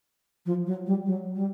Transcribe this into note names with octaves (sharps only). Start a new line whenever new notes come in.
F3
F#3
G3
F#3
G3